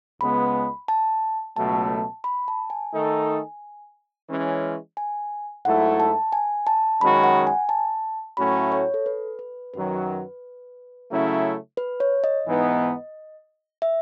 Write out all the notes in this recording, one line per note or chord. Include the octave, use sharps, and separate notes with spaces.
C#2 C#3 G#3 B3 B5
A5
C#2 B2 F#3 A3 A5
B5
A5
G#5
D#3 A3 D#4 A4
E3 G#3 C#4
G#5
G#2 F#3 A3 E4 A4 F#5
A5
G#5
A5
F#2 D#3 G#3 C#4 F#4 B5
F#5
G#5
A5
A2 F#3 A3 C#4 F#4 B5
C#5
A4
B4
B4
F#2 D#3 F#3 B4
C#3 F#3 A3 C#4 E4
B4
C#5
D#5
G#2 E3 B3 D#4
E5